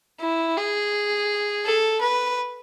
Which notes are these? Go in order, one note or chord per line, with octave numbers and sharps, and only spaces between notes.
E4
G#4
A4
B4